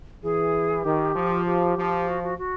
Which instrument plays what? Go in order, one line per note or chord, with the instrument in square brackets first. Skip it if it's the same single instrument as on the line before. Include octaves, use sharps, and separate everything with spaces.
[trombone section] E3 [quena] G#4
[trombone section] D#3 [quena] G4
[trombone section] F3
[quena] G4
[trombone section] F3
[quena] F#4
F#4
F#4